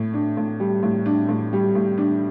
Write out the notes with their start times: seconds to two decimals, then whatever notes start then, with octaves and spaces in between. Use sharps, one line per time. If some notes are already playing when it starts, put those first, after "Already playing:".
Already playing: A2
0.14 D4
0.37 A2
0.60 G3
0.83 A2
1.06 D4
1.29 A2
1.53 G3
1.75 A2
1.98 D4